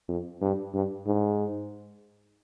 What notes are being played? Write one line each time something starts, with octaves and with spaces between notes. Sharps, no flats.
F2
G2
G2
G#2